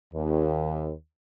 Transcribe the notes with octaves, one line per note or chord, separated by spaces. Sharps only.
D#2